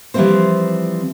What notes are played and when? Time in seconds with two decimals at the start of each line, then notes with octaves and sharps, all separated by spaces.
0.14 E3 F3 G3 A#3 C4 C5